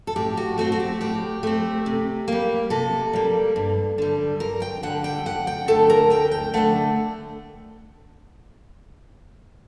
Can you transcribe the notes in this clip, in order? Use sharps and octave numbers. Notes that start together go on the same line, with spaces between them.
A4
A2 G4
F#4
A3 C4 F#4
F#4
G4
A2 G4
A3 C4
C3
G3 A#3
C3 A4
G3 A#3
G2
D3 G3
G2 A#4
G5
D3 G3 F#5
G5
D2 F#5
G5
D3 A3 A4
A#4
D2 G5
G5
D3 A3 F#5